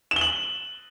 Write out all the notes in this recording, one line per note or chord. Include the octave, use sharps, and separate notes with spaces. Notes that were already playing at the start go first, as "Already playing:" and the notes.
E7
G7
F#7